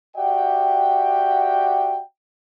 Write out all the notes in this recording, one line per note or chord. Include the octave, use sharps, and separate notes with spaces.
F#4 G4 D5 E5 F#5 G5